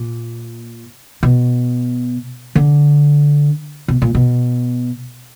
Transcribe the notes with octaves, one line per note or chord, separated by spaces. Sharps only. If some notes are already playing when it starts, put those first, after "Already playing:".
Already playing: A#2
B2
D3
B2
A#2
B2